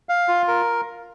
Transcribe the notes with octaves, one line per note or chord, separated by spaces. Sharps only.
F5
F4
A#4